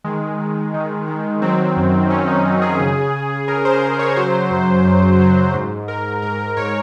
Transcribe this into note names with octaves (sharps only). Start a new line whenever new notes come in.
D#3 G#3
D#3
D#3
D#3
F#3 C4
F#2
F#2 C#4
D#4
F#2 C4
G#4
C#3
C#3
C#3 A#4
C5
C#3 C5
C#5
F#3 C5
F#2
F#2
F#3
G#2
G#2 A#4
G#2 A#4
A#4
G#2 C#5